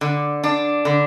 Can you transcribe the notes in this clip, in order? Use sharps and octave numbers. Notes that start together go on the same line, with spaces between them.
D3
D4
D3